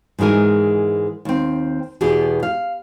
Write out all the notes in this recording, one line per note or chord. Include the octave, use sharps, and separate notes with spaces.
G#2 E3 G#3 A#4 G#5
D#2 C4
E2 B2 B3 G4 G#4
F5